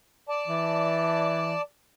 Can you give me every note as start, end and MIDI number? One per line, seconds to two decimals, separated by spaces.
0.29 1.61 74
0.29 1.61 81
0.48 1.55 52